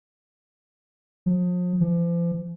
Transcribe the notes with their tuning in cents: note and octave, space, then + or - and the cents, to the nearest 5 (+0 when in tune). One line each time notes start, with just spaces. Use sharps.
F3 +40
F3 -40